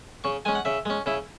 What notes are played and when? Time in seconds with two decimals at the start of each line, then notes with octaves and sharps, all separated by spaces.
0.24 C#3 C#6
0.45 G#3 C#4 G#5
0.55 F#5
0.65 C#3 E5
0.85 G#3 C#4
1.06 C#3 E4